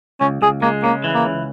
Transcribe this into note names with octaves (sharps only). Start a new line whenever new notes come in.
C#2 C#4
C#2 G#4
G#3 A#3
C#3 A#3
E3
A#3
C#2